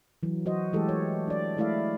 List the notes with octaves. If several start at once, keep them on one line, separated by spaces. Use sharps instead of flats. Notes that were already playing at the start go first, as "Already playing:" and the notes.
E3 F#3
F#3 F#4 C5 D#5
E3 G#3 A3 G4 A4
C#5
D4 D5
G#3 A3 E4 D5 E5 F5